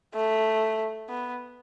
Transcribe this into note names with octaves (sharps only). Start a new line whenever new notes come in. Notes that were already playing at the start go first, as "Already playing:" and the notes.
A3
B3